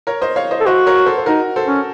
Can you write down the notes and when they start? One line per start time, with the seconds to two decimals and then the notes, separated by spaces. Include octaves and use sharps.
0.07 A#4 C#5
0.22 C5 D#5
0.36 C#5 F5
0.51 C5 D#5
0.61 A4
0.66 F#4 C5 D#5
0.86 A#4 C#5
1.06 A4 C5
1.18 C5
1.26 D#4 F#4 A#4
1.56 A4 C5
1.67 C#4